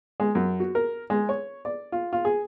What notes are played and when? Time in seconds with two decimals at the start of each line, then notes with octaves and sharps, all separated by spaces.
0.20 G#3
0.35 F#2
0.60 F#4
0.75 A#4
1.10 G#3
1.29 C#5
1.65 D5
1.92 F4
2.13 F4
2.25 G#4